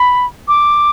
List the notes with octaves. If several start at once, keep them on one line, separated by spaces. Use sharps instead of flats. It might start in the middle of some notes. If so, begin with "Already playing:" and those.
Already playing: B5
D6